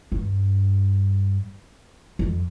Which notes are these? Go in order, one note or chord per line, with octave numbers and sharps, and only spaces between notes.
G2
F2